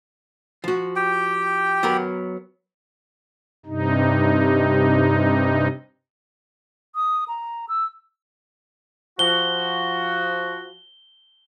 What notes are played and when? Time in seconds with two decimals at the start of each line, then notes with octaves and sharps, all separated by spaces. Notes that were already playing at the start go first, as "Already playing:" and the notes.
0.64 F3 F#4
0.96 G4 G5
1.83 F#3 B3 A#4
3.66 G2 C3 D#4
6.96 D#6
7.28 A#5
7.69 E6
9.19 F3 F#4 G7